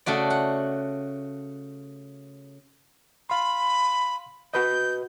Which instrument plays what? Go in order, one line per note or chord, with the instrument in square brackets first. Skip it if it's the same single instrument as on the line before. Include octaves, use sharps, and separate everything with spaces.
[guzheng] C#3 A3 F#4 D5
F#5
[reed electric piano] F5 C6 [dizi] B5
[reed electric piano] F#4 B4 D#5 [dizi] G6